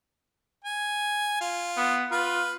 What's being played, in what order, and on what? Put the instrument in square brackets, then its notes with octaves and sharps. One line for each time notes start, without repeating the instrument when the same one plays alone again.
[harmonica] G#5
F4
[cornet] B3
[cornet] F4 [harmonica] B4